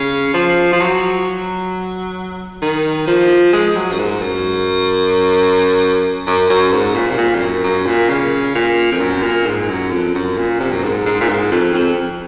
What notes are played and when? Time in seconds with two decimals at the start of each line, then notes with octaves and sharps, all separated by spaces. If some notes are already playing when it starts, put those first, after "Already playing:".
Already playing: C#3
0.34 F3
0.73 F3
0.80 F#3
2.62 D#3
3.07 F3
3.53 G#3
3.76 F#3
3.92 F#2
3.99 G#2
4.21 F#2
6.27 F#2
6.50 F#2
6.72 G#2
6.95 A#2
7.10 C3
7.18 A#2
7.35 F2
7.41 F#2
7.64 F#2
7.86 A#2
8.09 C#3
8.55 A#2
8.92 F2
9.00 F#2
9.23 A#2
9.46 G#2
9.69 F#2
9.92 F2
10.15 F#2
10.38 A#2
10.60 C3
10.72 F#2
10.83 G#2
11.06 G#2
11.21 A#2
11.29 G#2
11.52 F2
11.74 F2